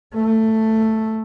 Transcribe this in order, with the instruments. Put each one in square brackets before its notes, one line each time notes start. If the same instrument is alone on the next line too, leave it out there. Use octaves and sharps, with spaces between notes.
[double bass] A3